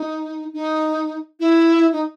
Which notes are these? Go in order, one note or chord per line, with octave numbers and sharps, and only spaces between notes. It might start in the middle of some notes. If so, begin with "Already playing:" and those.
Already playing: D#4
D#4
E4
D#4